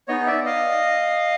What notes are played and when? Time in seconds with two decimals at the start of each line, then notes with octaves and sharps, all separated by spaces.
0.08 B3 D#4 G#4 C#5 D#5
0.27 D5 E5
0.45 D#5 F5